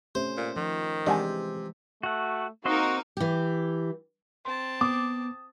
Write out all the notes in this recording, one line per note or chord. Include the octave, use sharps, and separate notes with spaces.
C3 A3 C#4 C5
A#2
D#3 F3
C3 E3 G#3 D4 C5 F#5 G#5
A3 F#4 F#5
A#3 C4 D#4 F#4 A#4 C5 D#5
E3 G4
C4 A5 C6
B3 D6 D#6